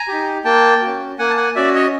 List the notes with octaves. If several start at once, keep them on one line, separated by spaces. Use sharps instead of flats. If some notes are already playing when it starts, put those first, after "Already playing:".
Already playing: G#5 A#5
D#4 G4
A#3 G5 A5
F#4
C#4
A#3 F#5 G#5
A5
F#5 G#5
C#4 F#4 D5 E5
C#5 D#5